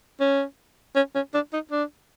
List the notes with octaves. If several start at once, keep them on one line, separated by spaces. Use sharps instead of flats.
C#4
C#4
C#4
D4
D#4
D4